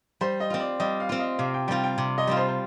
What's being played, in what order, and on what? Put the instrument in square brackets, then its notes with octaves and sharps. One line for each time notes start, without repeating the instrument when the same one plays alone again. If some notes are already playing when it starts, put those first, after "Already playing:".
[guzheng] G3 [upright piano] C5
[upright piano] D#5
[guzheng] C4 F4
[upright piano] D5
[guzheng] G3 [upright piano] D#5
[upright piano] F5
[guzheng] C4 F4
[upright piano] D#5
[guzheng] C3 [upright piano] F5
[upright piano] G5
[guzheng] G3 C4 F4 [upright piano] G5
[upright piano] G5
[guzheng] C3
[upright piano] D#5
[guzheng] G3 C4 F4
[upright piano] C5
C5